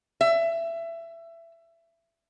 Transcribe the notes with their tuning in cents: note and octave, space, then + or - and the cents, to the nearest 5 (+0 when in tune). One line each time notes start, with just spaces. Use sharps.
E5 +20